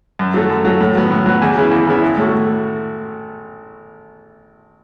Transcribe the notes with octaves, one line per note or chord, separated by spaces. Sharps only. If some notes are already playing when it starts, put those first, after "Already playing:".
F#2
F#3 A3
F#2
F#3 A3
A2
F#3 B3
A2
F#3 B3
E2
C#3 E3 B3 E4
E2
C#3 E3 B3 E4
A1
A2 A3 F#4